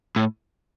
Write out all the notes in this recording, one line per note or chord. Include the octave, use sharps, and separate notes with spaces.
A2